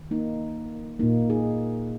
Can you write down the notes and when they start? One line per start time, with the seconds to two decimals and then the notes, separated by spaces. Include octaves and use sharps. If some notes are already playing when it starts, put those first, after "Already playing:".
Already playing: D#3
0.11 A#3 D#4
1.00 A#2 A#3 D#4
1.30 D#4 G#4